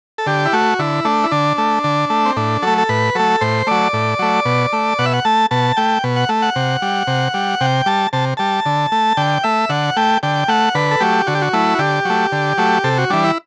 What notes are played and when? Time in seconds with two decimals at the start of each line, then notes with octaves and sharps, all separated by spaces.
0.18 A4
0.26 D3 G4
0.45 E4
0.53 A3 F#4
0.79 D3 E4
1.05 A3 D4
1.24 E4
1.31 D3 D4
1.58 A3
1.84 D3
2.10 A3
2.26 C4
2.36 A2 D4
2.62 F#3 A3 A4
2.78 A4
2.89 A2 B4
3.15 F#3 A3 A4
3.41 A2 C5
3.67 F#3 A3 D5
3.93 A2
4.19 F#3 A3
4.45 B2
4.73 A3
4.99 B2 F#5
5.05 E5
5.13 F#5
5.25 A3 A5
5.51 B2 A5
5.77 A3 G5
6.04 B2
6.16 F#5
6.29 A3
6.42 F#5
6.56 C3
6.82 G3
7.07 C3
7.34 G3
7.61 C3 G5
7.86 G3 A5
8.13 C3 A5
8.37 G3 A5
8.66 D3
8.92 A3
9.17 D3 G5
9.44 A3 E5
9.69 D3 F#5
9.97 A3 G5
10.23 D3 G5
10.48 A3 F#5
10.75 D3 B4
10.91 A4
11.00 F#3 A3 G4
11.27 D3 F#4
11.35 G4
11.42 F#4
11.53 F#3 A3 E4
11.75 F#4
11.79 D3 G4
12.05 F#3 A3
12.32 D3
12.58 F#3 A3
12.84 C3 A4
12.98 F#4
13.10 E3 G3 D4
13.24 E4